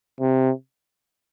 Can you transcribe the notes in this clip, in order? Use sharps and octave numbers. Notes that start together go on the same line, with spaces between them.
C3